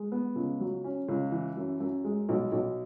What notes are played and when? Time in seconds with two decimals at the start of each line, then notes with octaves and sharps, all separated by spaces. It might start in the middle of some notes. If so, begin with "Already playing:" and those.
Already playing: G#3
0.12 B3
0.36 C#2
0.60 F#3
0.84 C#4
1.09 C#2
1.32 E3
1.57 F#2
1.80 F#2
2.04 G#3
2.29 B1
2.52 B1